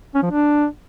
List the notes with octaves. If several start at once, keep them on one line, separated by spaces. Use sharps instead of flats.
C#4
F3
D4